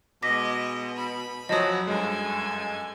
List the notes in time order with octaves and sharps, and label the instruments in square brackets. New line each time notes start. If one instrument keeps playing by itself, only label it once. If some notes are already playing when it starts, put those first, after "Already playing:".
[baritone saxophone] B2 [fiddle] G#3 D#5 [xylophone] D6 A#6 B6
[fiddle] B5
[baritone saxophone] F#2 [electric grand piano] F3 F#3 [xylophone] D#5 A5 D#6
[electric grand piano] G2 G#3 [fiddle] A4 G#5